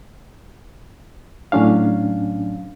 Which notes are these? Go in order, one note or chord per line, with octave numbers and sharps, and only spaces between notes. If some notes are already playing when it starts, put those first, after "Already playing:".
A2 F#3 C#4 D4 F5